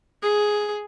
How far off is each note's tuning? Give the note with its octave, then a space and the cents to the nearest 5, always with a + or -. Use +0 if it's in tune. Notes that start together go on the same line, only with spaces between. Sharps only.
G#4 +5